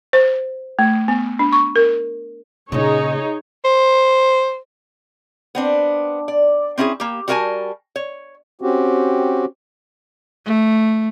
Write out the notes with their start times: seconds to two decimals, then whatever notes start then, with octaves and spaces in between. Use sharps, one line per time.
0.13 C5
0.79 A3
1.08 B3
1.39 D4
1.52 C#6
1.76 A#4
2.72 A#2 C#3 D#4 G#4 C#5
3.65 C5
5.55 B3 C4 D4
6.28 D5
6.78 C4 C#4 E4 F4 G#4
7.00 A#3 G4
7.28 G3 F#4 A#4 F#5 G#5 A5
7.96 C#5
8.62 C4 C#4 F#4 G4
10.45 A3